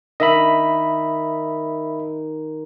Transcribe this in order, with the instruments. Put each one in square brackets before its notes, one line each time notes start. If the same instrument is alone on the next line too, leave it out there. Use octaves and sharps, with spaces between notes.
[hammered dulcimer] D#3 [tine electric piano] D#5 E5 B5